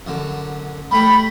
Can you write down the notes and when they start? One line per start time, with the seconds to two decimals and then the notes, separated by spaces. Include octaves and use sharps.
0.07 F#2 D3
0.91 G3 A3 G5 B5